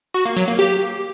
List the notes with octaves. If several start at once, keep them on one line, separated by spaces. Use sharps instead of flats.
F#4
A#3
F#3
A#3
G4